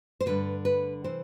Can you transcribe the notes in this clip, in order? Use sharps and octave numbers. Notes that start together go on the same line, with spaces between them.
C5
G2 D3 B4
B4
C3 E3 C5